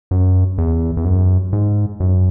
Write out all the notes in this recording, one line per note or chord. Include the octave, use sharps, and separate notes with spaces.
F#2
E2
E2
F#2
G#2
F#2